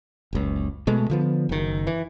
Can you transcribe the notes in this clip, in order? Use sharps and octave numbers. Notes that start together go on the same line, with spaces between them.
F#1 C#2
B2 G#3 A3
D3 F3 B3
F#1 D#3
E3